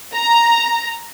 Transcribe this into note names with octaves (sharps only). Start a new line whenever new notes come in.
A#5